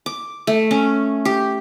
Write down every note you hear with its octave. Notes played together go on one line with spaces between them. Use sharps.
D6
A3
C#4
G4